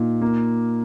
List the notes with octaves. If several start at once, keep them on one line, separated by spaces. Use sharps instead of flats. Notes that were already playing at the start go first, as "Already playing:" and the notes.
Already playing: A#2 D#4
A#3